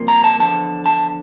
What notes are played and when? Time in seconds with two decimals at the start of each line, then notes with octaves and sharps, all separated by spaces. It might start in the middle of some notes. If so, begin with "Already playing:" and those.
Already playing: C2 C3 F3 A#3
0.08 A#5
0.24 A5
0.39 E2 D3 F3 A5
0.86 A5